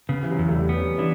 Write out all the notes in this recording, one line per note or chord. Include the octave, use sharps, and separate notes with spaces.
C#3 B3
E3
F#3
E2
A3
G3
B3
C#4
E3 D4